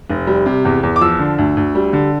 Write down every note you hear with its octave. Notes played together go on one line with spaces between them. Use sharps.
F1
G3
C3
E2
E2
D6
F3 E6
D3
D2
D2
G3
D3